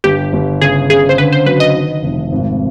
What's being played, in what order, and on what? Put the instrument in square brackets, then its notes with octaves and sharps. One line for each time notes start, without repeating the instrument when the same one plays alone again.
[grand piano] G1 [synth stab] G4
[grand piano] G1
[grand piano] C#3 [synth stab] G#4
[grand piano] C#3 [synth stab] G#4
[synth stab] C5
[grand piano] D3 [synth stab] B4
[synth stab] C5
[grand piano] F#3 [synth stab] B4
[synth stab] D#5
[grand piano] D#3
F1
G#1